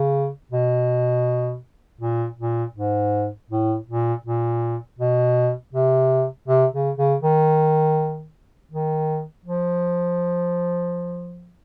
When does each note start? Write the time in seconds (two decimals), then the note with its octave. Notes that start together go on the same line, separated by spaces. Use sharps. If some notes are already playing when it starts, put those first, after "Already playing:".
Already playing: C#3
0.52 B2
2.01 A#2
2.38 A#2
2.75 G#2
3.50 A2
3.88 A#2
4.25 A#2
4.99 B2
5.73 C3
6.48 C3
6.73 C#3
6.98 C#3
7.23 D#3
8.72 D#3
9.46 F3